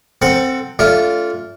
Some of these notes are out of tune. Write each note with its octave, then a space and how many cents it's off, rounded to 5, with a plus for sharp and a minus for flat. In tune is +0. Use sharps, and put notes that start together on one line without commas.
C4 +0 A4 +30 F#5 +0
A3 +0 D4 -35 F4 +0